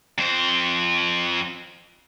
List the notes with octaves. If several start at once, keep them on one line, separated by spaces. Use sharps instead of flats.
F2 C5